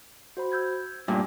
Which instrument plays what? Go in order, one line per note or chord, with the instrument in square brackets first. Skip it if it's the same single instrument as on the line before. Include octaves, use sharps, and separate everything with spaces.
[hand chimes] F#4 C5 B5
E6 G6 G#6
[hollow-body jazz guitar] G2 A#2 [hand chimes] G#5